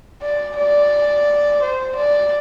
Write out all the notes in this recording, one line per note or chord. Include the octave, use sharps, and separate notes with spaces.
D5
D5
C5
D5